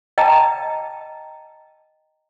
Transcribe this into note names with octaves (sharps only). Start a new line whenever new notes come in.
D#5 G5 A5 A#5